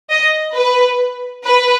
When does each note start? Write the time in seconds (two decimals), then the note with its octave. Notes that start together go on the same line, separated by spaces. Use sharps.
0.10 D#5
0.55 B4
1.44 B4